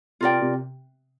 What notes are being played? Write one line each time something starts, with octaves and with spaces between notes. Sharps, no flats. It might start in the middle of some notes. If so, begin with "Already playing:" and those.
C3 F4 A#4 D5 G5
C3